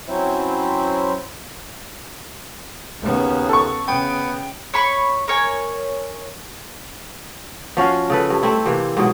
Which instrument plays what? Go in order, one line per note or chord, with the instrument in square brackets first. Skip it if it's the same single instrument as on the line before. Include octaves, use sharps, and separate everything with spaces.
[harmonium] F#3 C4 C#4 E4 C5 E5
[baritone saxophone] D#2 [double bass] C#3 B3
[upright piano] A4 C#6
[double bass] C#3 [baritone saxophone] B3 [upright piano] G5
[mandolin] C#5 B5 C#6
A#4 C#5 G#5
[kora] F3 C#4 F#4 F5
C#3 A4 B4
G2
A3 C4 E4
C3 E3 A#3
G#2 B2 F#3